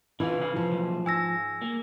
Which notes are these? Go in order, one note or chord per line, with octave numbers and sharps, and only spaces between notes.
E3 D4 D#4 F4 B4
C3 F5
F3
B1 E3
G#2 G#5 E6 A#6
A#3